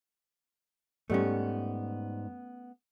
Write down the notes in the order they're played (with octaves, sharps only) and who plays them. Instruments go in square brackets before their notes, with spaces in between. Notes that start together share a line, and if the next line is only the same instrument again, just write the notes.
[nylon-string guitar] G#2 G3 [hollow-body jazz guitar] A3 B3 C#4